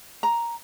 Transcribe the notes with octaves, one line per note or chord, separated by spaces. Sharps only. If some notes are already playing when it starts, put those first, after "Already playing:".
A#5